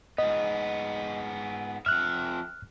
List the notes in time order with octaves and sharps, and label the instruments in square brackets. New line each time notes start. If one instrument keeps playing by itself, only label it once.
[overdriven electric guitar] G#2 B3 [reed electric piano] D#5
[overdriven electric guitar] F2 E5 [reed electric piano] F6 F#6